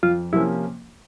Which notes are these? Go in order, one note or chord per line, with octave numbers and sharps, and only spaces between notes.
F2 F4
C3 F3 A#3 C#4 E4